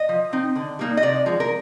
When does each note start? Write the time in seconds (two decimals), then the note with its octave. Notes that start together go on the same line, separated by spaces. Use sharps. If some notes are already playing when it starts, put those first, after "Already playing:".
Already playing: D#5
0.09 F3
0.33 C4 D#4
0.56 D3
0.79 G3 A#3 D#4
0.97 D#5
1.02 C3 D5
1.26 F3 G#3
1.40 A#4